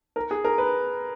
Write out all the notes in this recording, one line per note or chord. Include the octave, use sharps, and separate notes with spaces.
A#4
G#4
A#4
B4